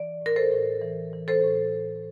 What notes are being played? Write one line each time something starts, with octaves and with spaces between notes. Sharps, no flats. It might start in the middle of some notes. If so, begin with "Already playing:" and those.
Already playing: E3 D5
A2 A#4
A4 C5
A2
E3
E3
A4 C5
A2